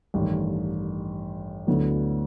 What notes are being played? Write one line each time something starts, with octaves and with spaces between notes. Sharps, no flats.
A1 G2 D#3
D2 D3 F#3 B3 E4